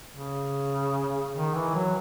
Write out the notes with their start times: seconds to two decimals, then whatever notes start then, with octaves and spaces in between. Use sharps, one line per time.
0.15 C#3
1.34 D#3
1.54 E3
1.75 F#3